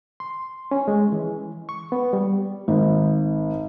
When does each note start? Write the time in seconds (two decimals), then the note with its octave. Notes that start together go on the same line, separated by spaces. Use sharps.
0.20 C6
0.71 C#4
0.88 G#3
1.12 E3
1.69 C#6
1.92 B3
2.13 G3
2.68 G#1